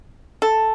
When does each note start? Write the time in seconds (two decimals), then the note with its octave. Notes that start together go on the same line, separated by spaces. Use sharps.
0.42 A4